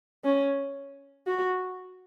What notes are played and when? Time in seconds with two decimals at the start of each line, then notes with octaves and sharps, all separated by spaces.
0.25 C#4
1.27 F#4